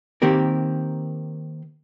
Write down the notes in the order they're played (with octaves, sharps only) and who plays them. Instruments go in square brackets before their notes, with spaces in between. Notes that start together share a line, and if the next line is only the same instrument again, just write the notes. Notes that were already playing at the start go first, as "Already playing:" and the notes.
[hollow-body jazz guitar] D#3 A#3 C4 G4 A#4